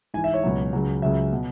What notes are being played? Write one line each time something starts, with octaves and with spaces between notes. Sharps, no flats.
G#2 E3 G#5
E5
C#5
C#2 B2 F#3
C#2 C#3 F#3
C#2 C#3 F#3 E5
B2 F#3